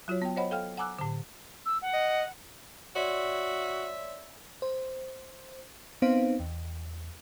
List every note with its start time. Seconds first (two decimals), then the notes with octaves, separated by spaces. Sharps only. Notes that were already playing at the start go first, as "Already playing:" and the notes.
0.08 F#3 F4 F#4 C#5
0.22 B3 G5
0.36 C5 C#5 D#5 F#5 B5
0.51 A4 F5 G5 F6
0.77 F#5 G#5 A#5 D6 E6 F#6
0.98 A2 D3
1.65 E6
1.82 F#5
1.93 D#5
2.96 F#4 C#5 D5 E5 C6
4.62 C5
6.02 B3 C4 D#4 C5 F5
6.40 E2